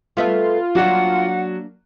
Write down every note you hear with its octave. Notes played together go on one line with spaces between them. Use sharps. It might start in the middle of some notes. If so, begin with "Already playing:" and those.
A3 B3 F4 E5
F#3 A#3 D4 F#4 F#5